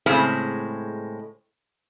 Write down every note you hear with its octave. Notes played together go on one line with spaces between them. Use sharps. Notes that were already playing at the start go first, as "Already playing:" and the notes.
A2 C#3 G#3 C4